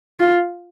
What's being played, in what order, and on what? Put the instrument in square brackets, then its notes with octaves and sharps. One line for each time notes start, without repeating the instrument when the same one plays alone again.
[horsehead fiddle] F4